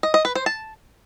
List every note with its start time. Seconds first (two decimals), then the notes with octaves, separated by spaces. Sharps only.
0.03 D#5
0.14 D#5
0.25 B4
0.35 C5
0.46 A5